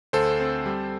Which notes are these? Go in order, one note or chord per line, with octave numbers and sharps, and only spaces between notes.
D2 A4 C5
C4
G3